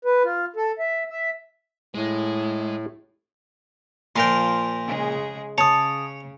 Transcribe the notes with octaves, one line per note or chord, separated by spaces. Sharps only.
B4
F4
A4
E5
E5
A2 G#3
A#2 F3 A#4 G5 C6
C#3 G#3 G#4
C#3 C#5 A5 D#6